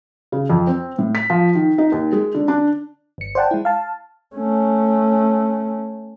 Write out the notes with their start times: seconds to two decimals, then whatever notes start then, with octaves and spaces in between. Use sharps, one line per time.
0.32 C#3
0.50 F2
0.67 C4
0.98 A2
1.15 B6
1.30 F3
1.55 D#3
1.78 D#4
1.92 D#2
2.13 G#3
2.35 D3
2.48 D4
3.18 G1 C#7
3.35 C5 D5 F#5 G5 A5
3.51 G#3 E4
3.65 F5 A5
4.36 A3 C#4